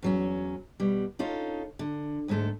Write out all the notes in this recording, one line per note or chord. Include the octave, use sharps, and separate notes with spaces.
E2 F#3 C#4
B2 G3
C#4 D#4 F4 A4
D3
D2 G#2 G#3 A3 A4